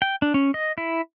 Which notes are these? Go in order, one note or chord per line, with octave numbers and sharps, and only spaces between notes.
G5
D4
C#4
D#5
E4